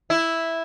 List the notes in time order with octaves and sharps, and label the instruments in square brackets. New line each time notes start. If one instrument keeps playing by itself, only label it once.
[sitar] E4